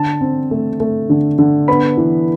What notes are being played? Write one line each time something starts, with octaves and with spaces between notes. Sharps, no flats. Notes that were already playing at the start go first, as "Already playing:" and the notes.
Already playing: D3 A5
C4
A3
A3
D3
D3
B3 B5
E3